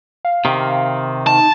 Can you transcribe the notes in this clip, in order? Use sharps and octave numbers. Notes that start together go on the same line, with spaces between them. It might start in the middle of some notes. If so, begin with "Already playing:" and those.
F5
C3 D#3
D#4 A5